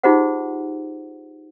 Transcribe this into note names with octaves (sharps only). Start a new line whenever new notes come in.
D#4 F4 G4 G#4 C5 F#5